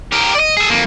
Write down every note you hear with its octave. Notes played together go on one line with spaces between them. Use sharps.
G4 A#4
D5 D#5
G#4 A4
F2 A#3